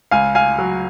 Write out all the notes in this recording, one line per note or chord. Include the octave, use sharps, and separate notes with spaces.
C#2 F5 G#5
F5 G#5
F#3